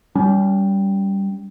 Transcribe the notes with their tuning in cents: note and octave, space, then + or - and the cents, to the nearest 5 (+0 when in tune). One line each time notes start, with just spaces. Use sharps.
G3 +0 C#4 +35